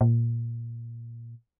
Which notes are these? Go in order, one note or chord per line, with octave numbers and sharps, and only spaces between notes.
A#2